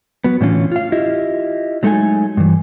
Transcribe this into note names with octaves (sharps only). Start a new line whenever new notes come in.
F#3 B3
A2 D3 E3 A3 C#4 F4
F4 F5
E4 F4 G4 D#5 E5
F#3 G#3 A3 D#4 A4 G#5
G2 E3